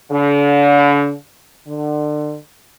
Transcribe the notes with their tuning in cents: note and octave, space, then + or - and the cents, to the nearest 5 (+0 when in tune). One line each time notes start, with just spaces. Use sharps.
D3 -40
D3 +30